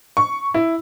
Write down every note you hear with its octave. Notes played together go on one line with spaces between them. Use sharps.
C#6
E4